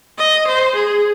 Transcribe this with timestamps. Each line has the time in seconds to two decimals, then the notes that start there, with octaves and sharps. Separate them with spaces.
0.18 D#5
0.47 C5
0.75 G#4